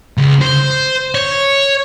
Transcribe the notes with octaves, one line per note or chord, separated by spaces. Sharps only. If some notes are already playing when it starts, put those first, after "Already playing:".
C#2
C5
C#5